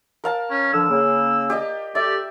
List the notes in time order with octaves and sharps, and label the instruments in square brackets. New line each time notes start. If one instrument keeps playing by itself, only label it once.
[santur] A#4 F5 A5
[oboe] C#4
[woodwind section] D3 F3 [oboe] E6
[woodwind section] C#3 A#3
[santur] G4 D5 D#5
[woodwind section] A3 G4 [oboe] D5 [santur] E5